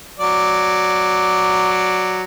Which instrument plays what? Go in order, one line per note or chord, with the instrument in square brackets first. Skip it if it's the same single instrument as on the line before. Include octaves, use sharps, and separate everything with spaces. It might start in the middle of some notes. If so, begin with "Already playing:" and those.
[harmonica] F#3 D5